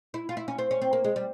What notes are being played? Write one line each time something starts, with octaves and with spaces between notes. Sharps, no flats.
E4
F4
E4
C#4
C4
C#4
C4
A#3
G#3
G3